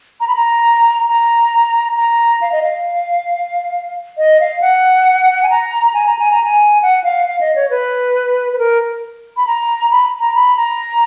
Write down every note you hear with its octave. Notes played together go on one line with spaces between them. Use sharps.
A#5
B5
A#5
A#5
A#5
F5
D#5
F5
D#5
F5
F#5
G#5
A#5
G#5
A#5
G#5
A#5
G#5
F#5
F5
F5
D#5
C#5
B4
B4
A#4
B5
A#5
B5
A#5
B5
A#5